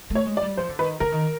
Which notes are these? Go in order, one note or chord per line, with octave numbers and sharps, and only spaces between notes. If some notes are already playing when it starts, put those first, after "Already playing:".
A3
C#5
G#3
D5
G3
F3 C5
D3
D#3 B4
D3 A#4
D#3